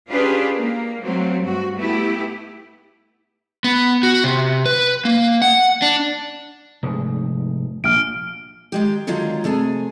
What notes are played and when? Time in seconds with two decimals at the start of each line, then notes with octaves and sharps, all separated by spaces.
0.10 C#4 D4 F4 G4 G#4 B4
0.58 A#3
1.04 F#3 A3 C4 F4
1.40 G2 F#4
1.76 A3 B3 E4 G4
3.64 B3
4.03 F#4
4.24 C3
4.66 B4
5.05 A#3
5.42 F#5
5.82 D4
6.83 F1 G#2
7.84 A#1 F6 D7
8.72 D#3 G#3 G4
9.07 D3 D#3 F#3 G#3 F4
9.44 C3 A3 G#4 G#5